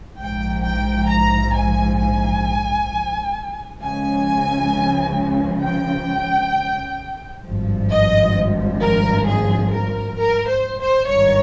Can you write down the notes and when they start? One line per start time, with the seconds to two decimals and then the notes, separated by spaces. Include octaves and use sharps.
0.17 A#1 G#2 F3 G5
0.63 G5
1.08 A#5
1.53 G#5
1.99 G#5
3.80 C#2 C#3 F3 G#5
5.63 G5
7.44 G#1 G2 F3
7.89 D#5
8.81 A#4
9.26 G#4
9.72 A#4
10.17 A#4
10.48 C5
10.77 C5
11.07 G#1 G2 D#3 C#5